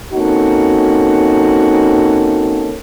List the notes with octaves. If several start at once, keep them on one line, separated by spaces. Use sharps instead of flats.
A#3 C4 C#4 D#4 F#4 A4